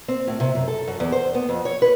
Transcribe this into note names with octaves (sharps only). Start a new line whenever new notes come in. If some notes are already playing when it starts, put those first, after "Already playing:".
C4
A2
C3
F#2
A4
F#2
E2
C5
B3
F2
C#5
B4